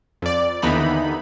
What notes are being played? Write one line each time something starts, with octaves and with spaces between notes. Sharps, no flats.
F2 D5
D#2 D3 E3 B3 D#4 B5